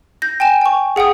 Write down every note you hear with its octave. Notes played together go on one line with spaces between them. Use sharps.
G6 A#6
G5 G#5 E7
G5 C#6
G#4 F#5 G5 D#6